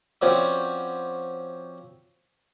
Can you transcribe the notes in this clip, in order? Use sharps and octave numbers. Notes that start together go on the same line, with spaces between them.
F3 C4 C#4 F#4 B4 D5